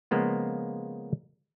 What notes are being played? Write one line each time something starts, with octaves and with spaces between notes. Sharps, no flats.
C#3 F3 G#3 A#3 B3 F4